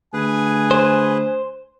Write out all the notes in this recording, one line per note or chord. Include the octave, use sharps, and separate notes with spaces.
D2 G#4 B4 G#5
C5